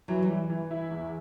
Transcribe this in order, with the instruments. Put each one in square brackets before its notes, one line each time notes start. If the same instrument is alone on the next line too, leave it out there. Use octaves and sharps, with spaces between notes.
[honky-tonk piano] E3 [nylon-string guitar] F#3
[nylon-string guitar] G3
[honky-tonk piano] E3
E3
E4
E2